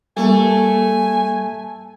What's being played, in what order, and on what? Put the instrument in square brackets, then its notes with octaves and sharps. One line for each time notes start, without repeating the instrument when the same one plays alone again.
[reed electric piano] G3 A#3 [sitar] A3 [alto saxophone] G#5